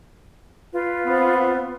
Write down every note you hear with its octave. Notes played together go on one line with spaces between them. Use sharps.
F4 B4
B3 C4